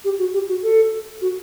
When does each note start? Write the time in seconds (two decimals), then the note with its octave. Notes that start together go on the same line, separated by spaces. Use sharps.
0.04 G4
0.19 F#4
0.34 G4
0.48 F#4
0.63 A4
1.22 F#4